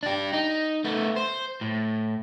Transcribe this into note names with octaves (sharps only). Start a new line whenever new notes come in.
D4 G4
D#4
A3 B3
C5
A2